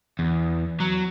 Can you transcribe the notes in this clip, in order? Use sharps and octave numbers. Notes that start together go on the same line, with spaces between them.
E2
F#3